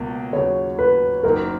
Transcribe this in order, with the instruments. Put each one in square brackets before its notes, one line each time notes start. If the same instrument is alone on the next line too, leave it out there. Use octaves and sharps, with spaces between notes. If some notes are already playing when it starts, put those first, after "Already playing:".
Already playing: [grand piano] C#2 B2 A#3
[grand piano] D#2 C#3 F#3 [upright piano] C#5
[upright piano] B4
[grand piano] F#1 F#2 D#3 F#3 A#3 [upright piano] A#4